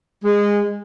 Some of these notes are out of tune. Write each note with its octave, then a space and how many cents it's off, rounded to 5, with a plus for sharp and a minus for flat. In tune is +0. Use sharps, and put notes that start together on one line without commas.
G#3 -20